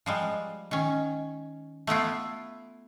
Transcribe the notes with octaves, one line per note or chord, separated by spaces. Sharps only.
F3 G3 G#3
D#3 C#4
A3 B3 E4 F4